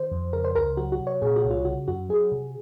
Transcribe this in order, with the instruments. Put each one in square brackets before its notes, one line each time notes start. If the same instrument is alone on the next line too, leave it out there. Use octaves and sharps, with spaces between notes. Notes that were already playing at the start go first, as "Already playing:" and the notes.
Already playing: [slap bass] D#3 [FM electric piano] C5
[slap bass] F2
[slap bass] C#3 [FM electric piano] A#4
[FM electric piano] C5
[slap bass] C#2 [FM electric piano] A#4
[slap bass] F#3 [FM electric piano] F#4
[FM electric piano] F#4
[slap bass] C3
[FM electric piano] C#5
[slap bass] A#2 [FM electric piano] G#4
[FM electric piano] F#4
[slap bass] C2
[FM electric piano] F4
[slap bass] C#3 [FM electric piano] F#4
[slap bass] F#2 [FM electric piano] F#4
[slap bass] F#3 [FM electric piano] G#4
[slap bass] C3